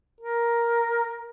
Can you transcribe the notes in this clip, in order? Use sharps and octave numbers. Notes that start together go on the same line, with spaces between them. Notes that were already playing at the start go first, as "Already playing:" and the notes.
A#4